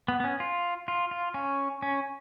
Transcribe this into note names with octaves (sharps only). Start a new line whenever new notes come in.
B3
B3
C#4
F4
F4
F4
C#4
C#4